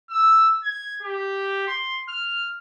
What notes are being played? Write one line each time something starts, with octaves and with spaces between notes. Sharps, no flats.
E6
G#6
G4
C6
F6